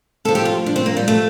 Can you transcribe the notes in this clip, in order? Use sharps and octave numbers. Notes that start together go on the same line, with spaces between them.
A2 F3 A4
G4
F4
D4
C4
A#3
G3
A3